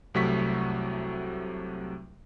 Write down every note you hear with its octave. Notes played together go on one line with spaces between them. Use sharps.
C2 C3 F#3 A3 C#6 B6